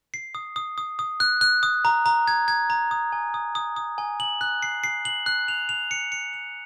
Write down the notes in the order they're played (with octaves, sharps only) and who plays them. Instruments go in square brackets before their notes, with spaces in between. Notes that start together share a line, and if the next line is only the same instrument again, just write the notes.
[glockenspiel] C7
D#6
D#6
D#6
D#6
F#6
F#6
D#6
A#5
A#5
G#6
G#6
A#5
D#6
G#5
D#6
D#6
D#6
G#5
F#7
F#6
C7
C7
F#7
F#6
F7
F7
C#7
C#7
F7